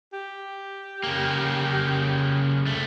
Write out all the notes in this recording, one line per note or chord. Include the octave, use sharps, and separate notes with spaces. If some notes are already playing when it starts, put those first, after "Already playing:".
G4
C#3 A#3
C2 A3